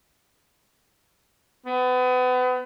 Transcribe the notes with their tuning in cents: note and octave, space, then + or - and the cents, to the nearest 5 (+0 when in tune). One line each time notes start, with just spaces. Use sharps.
B3 +35